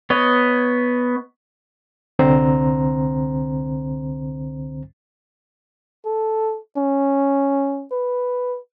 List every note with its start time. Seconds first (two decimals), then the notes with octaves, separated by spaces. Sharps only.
0.10 B3 C#5 D#5
2.19 C2 D3 C4 C5 A#5
6.05 A4
6.77 C#4
7.92 B4